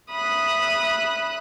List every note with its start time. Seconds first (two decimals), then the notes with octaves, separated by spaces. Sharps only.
0.11 E5 B5 D#6 F#6